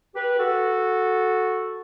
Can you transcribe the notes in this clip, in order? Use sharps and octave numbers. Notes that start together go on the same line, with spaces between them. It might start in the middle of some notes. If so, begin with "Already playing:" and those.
G4 B4
F#4 A4